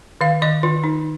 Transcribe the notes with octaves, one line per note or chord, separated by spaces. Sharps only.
D#3 F5
D#3 D#5
D#3 F4
D#4